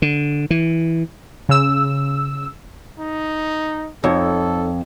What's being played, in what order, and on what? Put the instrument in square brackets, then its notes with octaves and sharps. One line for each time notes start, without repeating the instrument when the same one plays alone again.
[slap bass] D3
E3
[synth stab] C#3 E6
[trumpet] D#4
[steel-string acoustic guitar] F2 [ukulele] D#4 C#5 [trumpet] A4